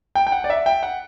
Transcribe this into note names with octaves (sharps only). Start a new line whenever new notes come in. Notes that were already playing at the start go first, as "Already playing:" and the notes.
G5
G5
F#5
D5
E5
G5
F#5